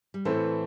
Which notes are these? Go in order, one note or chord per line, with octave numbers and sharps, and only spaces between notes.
G3
A2 E3 A3 C4 A4 C5